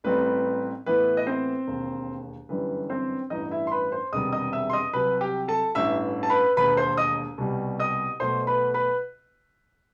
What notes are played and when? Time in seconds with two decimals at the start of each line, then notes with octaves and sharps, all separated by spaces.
0.04 A1 A2 G3 C4 D#4 B4
0.86 A2 E3 B3 E4 B4
1.17 D#5
1.27 C4 C5
1.67 E1 D#2 D#3
2.49 G1 F#2 E3 G3 B4
2.90 C4 C5
3.30 A1 G2 E3 D#4 D#5
3.51 E4 E5
3.67 C6
3.72 B4 B5
3.92 C5 C6
4.12 E1 E2 C3 D#3 G3 D#5 D#6
4.32 D#5 D#6
4.53 E5 E6
4.70 C6
4.73 D#5 D#6
4.93 C2 C3 F#3 B4 B5
5.21 G4 G5
5.48 A4 A5
5.75 A1 G2 E3 E5 E6
6.23 A5
6.30 B4 B5
6.57 E1 D#2 D#3 B4 B5
6.77 C5 C6
6.97 D#5 D#6
7.38 C2 B2 G3
7.80 D#5 D#6
8.20 B1 B2 A3 C5 C6
8.47 B4 B5
8.74 B4 B5